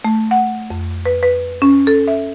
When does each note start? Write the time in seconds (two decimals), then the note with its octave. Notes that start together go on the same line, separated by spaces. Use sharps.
0.04 A3
0.31 F#5
0.70 F2
1.06 B4
1.23 B4
1.62 C#4
1.87 A4
2.08 E5